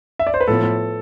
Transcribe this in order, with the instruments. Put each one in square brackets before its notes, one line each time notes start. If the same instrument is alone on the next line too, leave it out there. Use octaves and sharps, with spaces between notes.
[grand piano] E5
D5
C5
B4
[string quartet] A2 F3 B3 [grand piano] A4